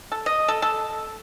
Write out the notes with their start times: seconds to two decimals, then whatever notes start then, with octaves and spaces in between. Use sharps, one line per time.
0.12 A4
0.26 D#5
0.48 A4
0.62 A4